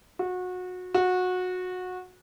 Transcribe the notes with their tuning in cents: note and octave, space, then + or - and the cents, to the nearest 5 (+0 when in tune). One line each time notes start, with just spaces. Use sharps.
F#4 -25
F#4 -20